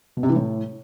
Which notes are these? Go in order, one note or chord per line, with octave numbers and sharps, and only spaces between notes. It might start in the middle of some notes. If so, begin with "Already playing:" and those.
B2
C3
E3
A2